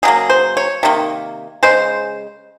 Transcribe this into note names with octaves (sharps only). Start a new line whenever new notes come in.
C#3 F#3 A#3 G#4
C5
C#5
C3 D#3 A#3
C#3 G#3 C5